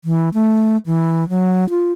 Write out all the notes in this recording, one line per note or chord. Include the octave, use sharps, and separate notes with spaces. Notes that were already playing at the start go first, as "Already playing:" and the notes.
E3
A3
E3
F#3
F4